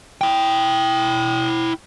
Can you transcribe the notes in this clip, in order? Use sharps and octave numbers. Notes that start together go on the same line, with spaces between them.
E4 G5